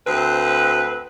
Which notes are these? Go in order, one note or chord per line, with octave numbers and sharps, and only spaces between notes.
D2 C4 B4